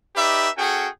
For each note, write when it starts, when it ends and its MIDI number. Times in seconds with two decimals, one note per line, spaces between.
0.16 0.48 63
0.16 0.48 67
0.16 0.48 71
0.16 0.48 74
0.16 0.48 76
0.58 0.89 61
0.58 0.89 66
0.58 0.89 68
0.58 0.89 69
0.58 0.89 79